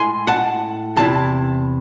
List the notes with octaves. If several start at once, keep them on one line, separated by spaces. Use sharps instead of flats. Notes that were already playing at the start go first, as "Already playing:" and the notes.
Already playing: A2 G#3 E4 G#5 C6
F#5 A5
E2 C3 E4 A5